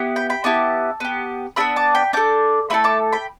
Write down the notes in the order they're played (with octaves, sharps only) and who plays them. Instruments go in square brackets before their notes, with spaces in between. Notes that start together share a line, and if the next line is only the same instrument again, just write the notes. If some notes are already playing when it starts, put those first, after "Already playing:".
Already playing: [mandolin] B3 E4 G4
G5 B5
G5 B5
B3 E4 G4 A5 D6
B3 G4
B3 D4 G4 B5 E6
A5 D6
G5 B5
D4 A4 D6 G6
A3 E4 A4 B5 E6
A5 D6
G5 B5